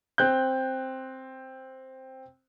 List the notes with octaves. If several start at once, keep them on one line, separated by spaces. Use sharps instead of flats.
C4 F#6 G6